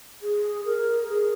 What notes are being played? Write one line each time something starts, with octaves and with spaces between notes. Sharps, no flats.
G#4
A#4
G#4